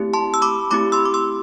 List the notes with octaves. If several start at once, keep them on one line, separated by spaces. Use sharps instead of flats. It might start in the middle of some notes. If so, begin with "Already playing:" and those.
Already playing: A3 C4 E4 G4
A5 C6
E6
B5 D6
A3 C4 E4 G4 B5 D6
C6 E6
D6
C6 E6